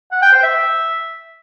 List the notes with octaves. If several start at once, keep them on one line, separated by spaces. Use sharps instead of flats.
F#5
G5
C5
E5